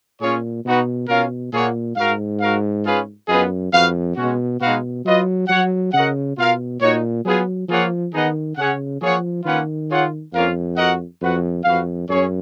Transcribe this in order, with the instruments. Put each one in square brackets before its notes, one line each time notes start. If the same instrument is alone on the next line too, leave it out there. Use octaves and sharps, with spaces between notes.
[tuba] A#2 [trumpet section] C#4 F4 G#4 C#5
[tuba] B2 [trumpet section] B3 D#4 F#4 B4
[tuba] B2 [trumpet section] C#4 F4 A#4 F5
[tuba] A#2 [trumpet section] A#3 F4 G#4 C#5 F#5
[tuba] G#2 [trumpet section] F#4 A#4 F5
[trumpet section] F#4 A#4 F5
C#4 F4 G#4 B4 F5
[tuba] F#2 [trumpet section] B3 F4 G#4 B4 D#5
[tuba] F2 [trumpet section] F#4 B4 F5
[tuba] B2 [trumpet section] G#3 C#4 F#4
[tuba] B2 [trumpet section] G#3 D#4 F#4 B4 F5
[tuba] F#3 [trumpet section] F4 B4 D#5
[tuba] F#3 [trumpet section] F#4 C#5 F#5
[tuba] C#3 [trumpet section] F#4 A#4 D#5 F#5
[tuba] B2 [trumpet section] F4 A#4 F5
[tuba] A#2 [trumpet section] D#4 F#4 C#5
[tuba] F#3 [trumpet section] B3 F4 G#4
[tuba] F3 [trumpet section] A#3 F4 G#4 C#5 F#5
[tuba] D#3 [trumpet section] B3 D#4 G#4 D#5 F#5
[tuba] C#3 [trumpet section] C#4 G#4 C#5 F#5
[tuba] F3 [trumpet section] A#3 F4 G#4 C#5 F#5
[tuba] D#3 [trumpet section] A#3 C#4 F4 B4 F#5
[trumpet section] F4 G#4 C#5 F#5
[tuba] F2 [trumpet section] A#3 C#4 F4 A#4 F5
[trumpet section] F#4 A#4 D#5 F#5
[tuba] F2 [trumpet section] F#4 B4 F#5
[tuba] F2 [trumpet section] F#4 B4 F5
[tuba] F#2 [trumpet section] C#4 G#4 C#5